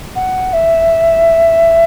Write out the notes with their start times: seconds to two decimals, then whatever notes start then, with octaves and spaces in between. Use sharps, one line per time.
0.15 F#5
0.53 E5